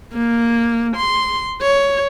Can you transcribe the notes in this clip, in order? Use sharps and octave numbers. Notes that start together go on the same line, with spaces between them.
A#3
C6
C#5